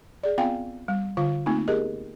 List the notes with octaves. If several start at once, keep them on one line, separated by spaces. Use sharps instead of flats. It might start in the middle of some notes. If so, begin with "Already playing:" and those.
G#4 D5
B3 C4 F4 F5 G5 G#5
G3
D3 F4 F5
A3 A#3 C4 D#4 F4
B3 G4 G#4 A#4 D#5